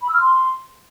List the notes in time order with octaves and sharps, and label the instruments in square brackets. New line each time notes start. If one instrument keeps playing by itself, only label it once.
[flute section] B5
E6
F6
C6